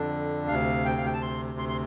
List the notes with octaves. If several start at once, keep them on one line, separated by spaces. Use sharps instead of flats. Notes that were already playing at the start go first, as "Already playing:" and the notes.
Already playing: F2 D3 D4
D2 C3 F5
G5
F5
G5
A5
C6
C6
C6